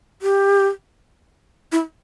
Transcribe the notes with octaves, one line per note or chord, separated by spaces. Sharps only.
G4
E4